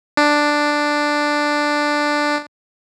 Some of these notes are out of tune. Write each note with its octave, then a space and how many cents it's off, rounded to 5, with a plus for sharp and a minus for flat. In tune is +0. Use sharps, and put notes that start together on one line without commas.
D4 +5